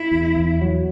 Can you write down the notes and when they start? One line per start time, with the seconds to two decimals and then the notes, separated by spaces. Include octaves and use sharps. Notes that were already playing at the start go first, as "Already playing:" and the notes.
Already playing: E4
0.11 E2
0.36 E2
0.61 F#3